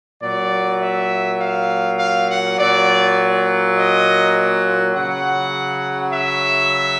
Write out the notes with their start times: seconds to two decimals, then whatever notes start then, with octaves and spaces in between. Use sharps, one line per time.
0.22 A#2 F#3 D5
0.82 E5
1.40 F5
1.99 F5
2.30 F#5
2.59 A#2 F#3 D5
3.78 D#5
4.95 C#3 F#3 F#5
6.14 E5